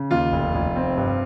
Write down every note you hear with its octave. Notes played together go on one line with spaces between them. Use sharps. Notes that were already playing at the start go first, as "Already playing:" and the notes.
Already playing: C#3
D#2 F4
F1
F1
C4
G2